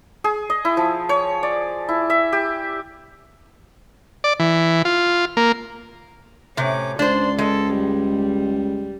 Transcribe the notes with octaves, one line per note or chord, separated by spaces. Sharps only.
G#4
D#5
E4
F3
C#5
D5
E4
E5
G4
D5
E3
F4
A#3
A2 C3 C#4 D6
C#2 D4 C5 D5 C6
G#3 A4
G3